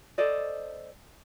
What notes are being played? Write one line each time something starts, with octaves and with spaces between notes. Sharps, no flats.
A4 C5 D5 D#5